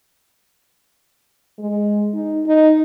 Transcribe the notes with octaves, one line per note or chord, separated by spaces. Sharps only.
G#3
D#4
D#4